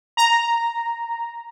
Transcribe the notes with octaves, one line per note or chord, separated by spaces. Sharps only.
A#5